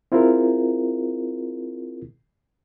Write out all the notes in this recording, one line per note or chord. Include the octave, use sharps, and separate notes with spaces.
C4 E4 F4 G#4 A#4